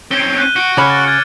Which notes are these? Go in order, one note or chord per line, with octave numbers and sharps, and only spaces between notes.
C4 C#4 G7
F#6 G6 D#7
F#4 C#7 D7
C#3 C#5 B5 D6 F6 C#7
A6
F6 G#6 A6